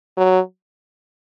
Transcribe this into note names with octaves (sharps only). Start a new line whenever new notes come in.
F#3